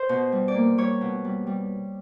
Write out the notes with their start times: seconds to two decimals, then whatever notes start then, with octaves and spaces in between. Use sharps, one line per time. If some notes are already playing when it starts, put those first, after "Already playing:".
Already playing: C5
0.09 B2
0.32 G3
0.48 D5
0.55 A#3
0.78 G3 C#5
1.01 B2
1.25 G3
1.47 G3